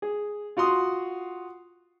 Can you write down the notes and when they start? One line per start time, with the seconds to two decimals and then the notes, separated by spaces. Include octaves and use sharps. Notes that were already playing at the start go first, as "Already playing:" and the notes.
0.02 G#4
0.57 F4 F#4 F#5 C6 D#6